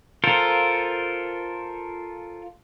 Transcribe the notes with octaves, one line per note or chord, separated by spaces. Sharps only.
F4 A4 A#4 C5